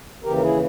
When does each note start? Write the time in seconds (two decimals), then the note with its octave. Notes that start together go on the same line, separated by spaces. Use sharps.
0.23 D#2 C#3 E3 G4 A#4
0.36 A#4
0.42 E4 G#4